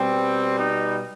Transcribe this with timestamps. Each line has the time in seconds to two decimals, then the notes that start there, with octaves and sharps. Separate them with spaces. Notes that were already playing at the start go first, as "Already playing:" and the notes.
Already playing: B2 G3 C4
0.59 D#4